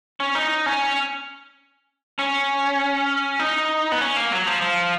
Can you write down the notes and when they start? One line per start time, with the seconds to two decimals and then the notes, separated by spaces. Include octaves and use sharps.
0.20 C#4
0.35 D#4
0.66 C#4
2.19 C#4
3.40 D#4
3.92 B3
4.01 C#4
4.16 A#3
4.32 F#3
4.47 F3
4.62 F3